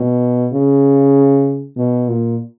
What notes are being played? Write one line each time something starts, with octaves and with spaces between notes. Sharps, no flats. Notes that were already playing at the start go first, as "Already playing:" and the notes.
Already playing: B2
C#3
B2
A#2